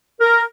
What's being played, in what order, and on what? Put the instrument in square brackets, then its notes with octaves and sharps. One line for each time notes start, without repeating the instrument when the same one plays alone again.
[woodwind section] A#4